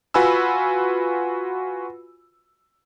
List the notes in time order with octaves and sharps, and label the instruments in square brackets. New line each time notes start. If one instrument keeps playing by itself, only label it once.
[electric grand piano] F4 F#4 B4 G#5 B5 E6